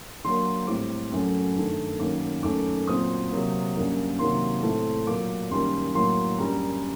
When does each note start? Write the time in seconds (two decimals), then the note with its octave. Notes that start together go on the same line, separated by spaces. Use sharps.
0.24 D3 F#3 A#3 C6
0.67 A2 G3 C4 D6
1.12 F#2 F#3 A3
1.56 G2 D#3 A3
1.99 F#2 D#3 F#3 A#3 D6
2.43 F#2 D#3 A3 D6
2.87 A#2 F#3 C4 D#6
3.31 C3 F#3 A#3
3.75 F#2 D3 G3 A#3
4.19 C3 D#3 F#3 A#3 C6
4.63 A2 A3 C4
5.07 A#2 F#3 A#3 D6
5.50 F#2 D#3 G3 A#3 C6
5.95 A2 F#3 A#3 C6
6.39 F#2 D3 G3 A#3 A#5